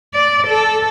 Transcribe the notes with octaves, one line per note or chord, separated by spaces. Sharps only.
D5
A4